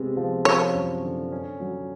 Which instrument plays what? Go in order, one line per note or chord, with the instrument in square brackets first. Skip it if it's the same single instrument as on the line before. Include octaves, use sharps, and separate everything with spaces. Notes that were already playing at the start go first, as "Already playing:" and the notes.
Already playing: [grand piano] C3 G#3 B3
F3
[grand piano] F3 [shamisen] C#5
[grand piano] F#2
D3
C#4
F#3